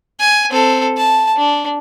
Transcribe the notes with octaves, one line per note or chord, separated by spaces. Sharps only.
G#5
C4 A4
A5
D4